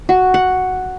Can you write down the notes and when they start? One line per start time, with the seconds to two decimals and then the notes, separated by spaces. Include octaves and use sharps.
0.09 F#4
0.34 F#5